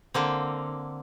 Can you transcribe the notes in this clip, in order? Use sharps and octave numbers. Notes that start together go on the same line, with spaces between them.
D3 A#3 C4